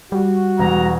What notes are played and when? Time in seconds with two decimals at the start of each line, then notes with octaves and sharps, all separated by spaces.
0.12 G3 F#4
0.59 E1 A#5